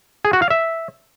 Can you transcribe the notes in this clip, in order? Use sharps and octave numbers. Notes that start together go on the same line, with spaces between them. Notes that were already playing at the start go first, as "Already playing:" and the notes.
G#4
F#4
F5
E5